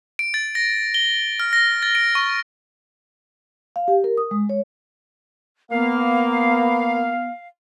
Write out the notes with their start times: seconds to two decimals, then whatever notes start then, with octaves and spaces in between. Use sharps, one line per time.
0.19 D7
0.34 A6
0.55 A#6
0.94 G7
1.40 F6
1.53 A#6
1.83 A6
1.95 D7
2.15 C#6
3.76 F5
3.88 G4
4.04 A#4
4.17 D#6
4.31 G#3
4.49 C#5
5.72 A#3 B3 F5